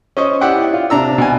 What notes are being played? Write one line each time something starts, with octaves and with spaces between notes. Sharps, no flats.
C#4 C5 D#5 C#6
E4 G4 D5 E5 F#5 G5
F4
C3 D4 A#5 E6
B2 G#5